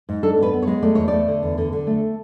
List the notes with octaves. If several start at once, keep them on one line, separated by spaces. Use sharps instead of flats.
G#2
D4 A4
B3
B4
B3
C#5
G#3
A3 D5
E2 C#5
A3 D5
D3
E2
D3
D3
A3